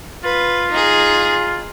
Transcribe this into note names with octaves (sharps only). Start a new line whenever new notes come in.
F4 B4
D#4 G#4